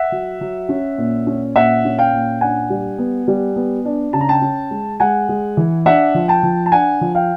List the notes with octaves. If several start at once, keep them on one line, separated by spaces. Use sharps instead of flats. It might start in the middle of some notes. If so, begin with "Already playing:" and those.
Already playing: E5 F#5
F#3
F#3
C#4
A#2
C#4
A#2 E5 F#5
C#4
F5 G5
A#2
D4 F#5 G#5
G3
B3
G3
B3
D4
C#3 A5
A#5
G5 A5
C#4
G#3
G#3 F#5 G#5
G#3
E3
D4 E5 F#5
F3
G5 A5
F3
A5
D4 F#5 G#5
F3
F5 G5